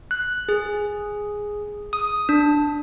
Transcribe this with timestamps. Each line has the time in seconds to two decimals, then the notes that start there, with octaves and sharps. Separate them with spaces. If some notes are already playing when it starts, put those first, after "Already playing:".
0.11 F#6
0.49 G#4
1.93 D#6
2.29 D4